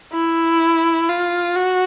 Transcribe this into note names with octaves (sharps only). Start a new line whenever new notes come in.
E4
F4
F#4